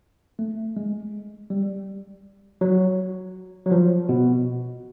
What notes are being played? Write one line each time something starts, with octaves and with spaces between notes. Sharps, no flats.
A3
G#3
G3
F#3
F#3
F3
B2